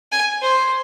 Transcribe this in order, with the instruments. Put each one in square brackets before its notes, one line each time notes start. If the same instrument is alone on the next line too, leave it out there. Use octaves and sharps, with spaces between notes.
[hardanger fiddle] G#5
C5